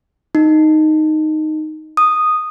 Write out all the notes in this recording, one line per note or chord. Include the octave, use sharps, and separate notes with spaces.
D#4
D#6